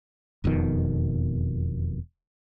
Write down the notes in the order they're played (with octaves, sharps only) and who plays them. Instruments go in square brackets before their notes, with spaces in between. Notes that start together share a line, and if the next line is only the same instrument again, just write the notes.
[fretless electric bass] E1 F2 B2 D#3